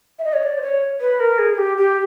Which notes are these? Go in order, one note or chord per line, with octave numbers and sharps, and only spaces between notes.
E5
D#5
C#5
D5
C5
C#5
B4
A#4
G#4
G#4
G4
G4